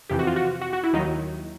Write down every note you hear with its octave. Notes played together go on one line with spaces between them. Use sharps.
F2 C3 E3 G4
F#4
F4
F#4
F#4
F#4
E4
D#2 D#3 F#3 D#4